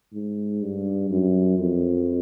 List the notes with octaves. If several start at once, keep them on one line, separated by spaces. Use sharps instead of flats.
G#2
G2
F#2
F2